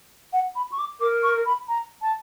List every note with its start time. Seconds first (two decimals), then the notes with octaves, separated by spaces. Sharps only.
0.33 F#5
0.56 B5
0.72 C#6
0.79 D6
1.01 A#4 D6
1.23 C#6
1.46 B5
1.68 A#5
2.02 A5